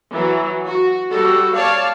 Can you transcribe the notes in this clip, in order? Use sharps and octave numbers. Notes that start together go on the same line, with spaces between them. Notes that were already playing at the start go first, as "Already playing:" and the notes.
E3 F#3
F#4
G3 F#4 A4
C#5 D5 F5 A5